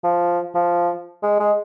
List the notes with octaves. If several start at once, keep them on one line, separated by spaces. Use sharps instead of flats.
F3
F3
G#3
G#3